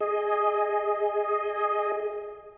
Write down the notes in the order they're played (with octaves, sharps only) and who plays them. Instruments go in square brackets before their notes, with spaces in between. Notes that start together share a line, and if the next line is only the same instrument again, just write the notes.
[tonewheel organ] G#4 D#5